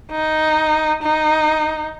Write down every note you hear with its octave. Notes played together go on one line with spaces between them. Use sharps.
D#4
D#4